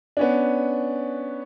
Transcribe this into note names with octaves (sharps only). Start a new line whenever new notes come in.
B3 C#4 D4